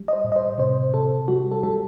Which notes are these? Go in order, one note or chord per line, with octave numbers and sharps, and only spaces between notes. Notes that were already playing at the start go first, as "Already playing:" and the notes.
Already playing: G3
D#5
C5
A2
D#5
C5
C3 C5
C3 A4
G3 F#4
A4
G3 A4